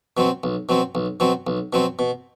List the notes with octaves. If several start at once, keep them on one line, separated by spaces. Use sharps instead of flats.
B2 F#3 C4
B1
B2 F#3 C4
B1
B2 F#3 C4
B1
B2 F#3 C4
B2